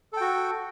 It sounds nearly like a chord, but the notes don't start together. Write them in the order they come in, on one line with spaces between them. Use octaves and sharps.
A4 G5 F#4